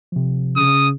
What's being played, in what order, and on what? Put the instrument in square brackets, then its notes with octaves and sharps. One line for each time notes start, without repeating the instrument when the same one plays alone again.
[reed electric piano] C3 F3
[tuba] C#3 [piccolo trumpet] D#6